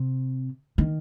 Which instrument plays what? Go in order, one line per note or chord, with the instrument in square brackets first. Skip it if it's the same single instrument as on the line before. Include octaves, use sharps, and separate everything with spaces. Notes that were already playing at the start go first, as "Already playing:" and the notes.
Already playing: [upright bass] C3
D#3